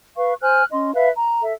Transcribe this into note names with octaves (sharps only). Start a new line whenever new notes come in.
B4 F5 C#6
C5 G#5 F6 F#6
C#4 D#5 C6
B4 E5 F5
A#5
A4 E5